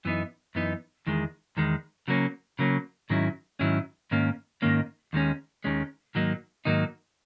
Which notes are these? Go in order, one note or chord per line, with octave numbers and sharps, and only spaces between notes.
F#2 E3 B3 D#4
F#2 E3 B3 D#4
E2 D#3 G#3
E2 D#3 G#3
C#3 F#3 A#3 C#4
C#3 F#3 A#3 C#4
G#2 D#3 F#3 C#4 E4
G#2 D#3 F#3 C#4 E4
G#2 D#3 A#3 C#4
G#2 D#3 A#3 C#4
D#2 D#3 G#3 C#4
D#2 D#3 G#3 C#4
G#2 D#3 F#3 A#3 D#4
G#2 D#3 F#3 A#3 D#4